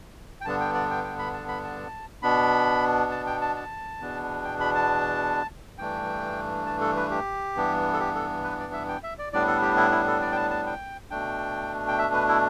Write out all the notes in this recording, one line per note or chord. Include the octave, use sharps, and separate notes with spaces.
G5
G2 D3 B3 D4 A5
G5
D5
G5
G5
B5
A5
B5
A5
B2 B3 D4 B5
A5
G5
A5
A5
E2 B2 B3 D4
G5
B5
A5
G2 E3 A3 D4 G5
A5
A4
B4
G4
G2 E3 B3 D4
A4
G4
A4
B4
D5
E5
G5
E5
D5
A2 G3 B3 D4 D5
A4
G4
E4
E4
A4
D5
G5
A5
A5
G5
B2 A3 D4 G5
G5
E5
B4
E4